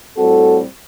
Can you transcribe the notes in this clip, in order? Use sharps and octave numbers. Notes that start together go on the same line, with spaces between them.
A2 G3 C4 F#4 A4